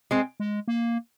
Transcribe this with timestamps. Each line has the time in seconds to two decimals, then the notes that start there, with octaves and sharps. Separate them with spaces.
0.11 G#3 C4
0.40 G#3
0.68 A#3